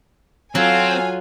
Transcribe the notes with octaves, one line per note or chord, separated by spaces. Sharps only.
F#3 C4 F4 A4 F5 G#5